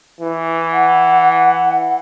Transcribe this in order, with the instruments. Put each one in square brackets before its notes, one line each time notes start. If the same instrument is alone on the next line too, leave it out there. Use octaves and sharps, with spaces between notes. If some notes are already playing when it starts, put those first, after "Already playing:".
[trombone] E3
[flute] F#5